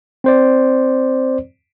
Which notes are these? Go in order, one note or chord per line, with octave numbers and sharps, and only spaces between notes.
C4 C5 D5